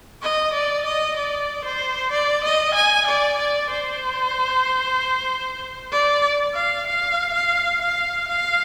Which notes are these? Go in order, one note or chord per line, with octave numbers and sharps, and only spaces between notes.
D#5
D5
D#5
D5
C5
D5
D#5
G#5
D5
D5
C5
D5
F5
F5
F5
F5
F5